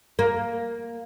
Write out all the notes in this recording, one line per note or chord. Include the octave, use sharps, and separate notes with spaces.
A#3